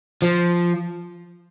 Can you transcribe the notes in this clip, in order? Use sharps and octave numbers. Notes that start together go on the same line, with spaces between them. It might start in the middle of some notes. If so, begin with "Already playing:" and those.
F3